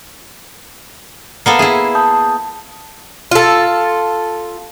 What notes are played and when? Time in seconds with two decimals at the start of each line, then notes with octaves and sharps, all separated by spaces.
1.46 A#3 B3 A4 C7
1.59 E4 G#4 E5
1.95 A5 D#6 G6
3.31 F4 A4